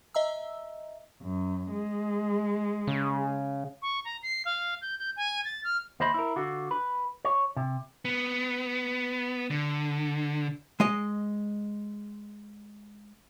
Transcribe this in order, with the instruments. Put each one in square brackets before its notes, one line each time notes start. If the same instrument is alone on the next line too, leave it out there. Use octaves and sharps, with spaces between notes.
[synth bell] D#5 E5 A#5 E6
[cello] F#2
G#3
[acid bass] C#3
[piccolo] C#6
A#5
C7
F5
G6
G6
G#5
A6
F6
[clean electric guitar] D#2 C5 D#5 E5 B5 C6
E4 A#4
D3 F4 F#4
B4
C#5
C3
[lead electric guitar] B3
D3
[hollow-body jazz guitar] G#3 D#5